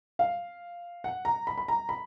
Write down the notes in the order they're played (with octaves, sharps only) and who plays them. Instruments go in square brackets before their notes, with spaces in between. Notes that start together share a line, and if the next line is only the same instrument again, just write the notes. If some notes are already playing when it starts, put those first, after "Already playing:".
[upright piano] F5
F#5
A#5
B5
B5
A#5
B5